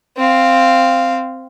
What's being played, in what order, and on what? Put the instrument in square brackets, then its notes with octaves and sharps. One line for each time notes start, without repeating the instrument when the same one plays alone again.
[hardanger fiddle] C4 F5